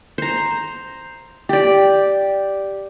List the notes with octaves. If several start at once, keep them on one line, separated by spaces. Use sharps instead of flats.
C5 A#5
G4 D5